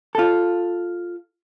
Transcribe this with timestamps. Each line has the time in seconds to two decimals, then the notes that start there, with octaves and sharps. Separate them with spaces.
0.15 F4 A4